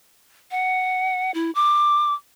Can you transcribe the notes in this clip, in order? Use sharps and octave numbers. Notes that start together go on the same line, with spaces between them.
F#5
E4
D6